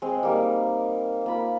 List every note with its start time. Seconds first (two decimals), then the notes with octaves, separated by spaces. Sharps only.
0.02 G#3 C4
0.23 G3 A#3 D#4
1.26 A#3 F4 B5